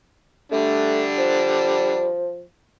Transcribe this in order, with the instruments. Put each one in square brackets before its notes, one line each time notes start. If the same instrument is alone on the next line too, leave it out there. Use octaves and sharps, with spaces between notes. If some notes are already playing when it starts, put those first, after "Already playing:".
[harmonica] D3 G3 D4 [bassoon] A3
[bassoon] F3